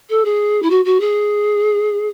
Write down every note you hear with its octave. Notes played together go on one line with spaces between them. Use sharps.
A4
G#4
E4
F#4
F#4
G#4